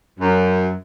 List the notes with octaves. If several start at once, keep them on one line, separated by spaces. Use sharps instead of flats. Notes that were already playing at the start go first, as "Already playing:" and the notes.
F#2